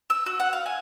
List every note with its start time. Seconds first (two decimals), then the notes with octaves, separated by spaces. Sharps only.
0.10 E6
0.26 F#4
0.40 F#5
0.53 F5
0.66 G#5